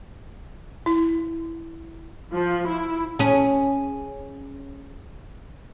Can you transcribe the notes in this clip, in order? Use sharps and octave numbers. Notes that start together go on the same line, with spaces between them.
E4
F3
E4
C#4 G#4